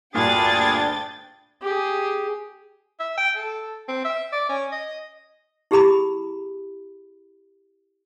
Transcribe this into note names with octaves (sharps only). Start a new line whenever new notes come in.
D2 G2 A#2 D4 G#4 G5 A6
G4 G#4
E5
G5
A4
C4
E5
D5
C#4
D#5
E4 G4 G#4 A#5 B5 D#6